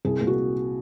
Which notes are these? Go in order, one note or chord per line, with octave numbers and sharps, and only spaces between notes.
C2 G#4
A#2
F#4